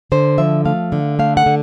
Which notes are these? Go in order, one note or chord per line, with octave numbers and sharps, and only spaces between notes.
D3 C5
F3 E5
A3 F5
D3
A3 F5
F#5
D3